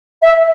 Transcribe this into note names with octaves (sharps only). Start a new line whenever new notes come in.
E5